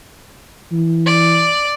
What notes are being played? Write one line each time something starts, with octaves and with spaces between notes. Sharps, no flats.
E3
D5